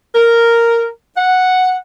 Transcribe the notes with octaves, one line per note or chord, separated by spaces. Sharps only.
A#4
F#5